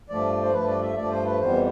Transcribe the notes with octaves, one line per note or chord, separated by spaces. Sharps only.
G2 F3 A3 D5
C5
G2 F3 A3 B4
D5
E5
G2 F3 A3 D5
C5
B4
F2 E3 G3 B3 C5